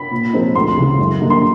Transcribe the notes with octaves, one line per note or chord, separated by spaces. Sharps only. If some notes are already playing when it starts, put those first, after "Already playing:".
Already playing: B5
A#2
F3 G#3 C4 D#4
D2 C6
C#3 E3 G#3
F#2
D3 G3 A#3 D#4
C6